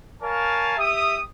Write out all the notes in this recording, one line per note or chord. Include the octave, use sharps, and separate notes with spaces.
A#4 C#5 F5 G#5 A5
G4 E5 D#6